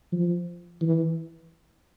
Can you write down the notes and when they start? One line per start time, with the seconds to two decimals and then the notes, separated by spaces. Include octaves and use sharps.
0.12 F3
0.82 E3